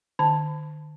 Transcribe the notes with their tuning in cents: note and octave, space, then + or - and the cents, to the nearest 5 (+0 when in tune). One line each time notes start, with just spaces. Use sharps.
D#3 -45 A5 +0